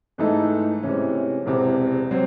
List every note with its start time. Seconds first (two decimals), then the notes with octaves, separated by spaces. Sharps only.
0.18 G#2 E3 A3 D#4 A4
0.83 C3 E3 G#3 C#4
1.46 E1 E2 C3
2.11 F#3 C4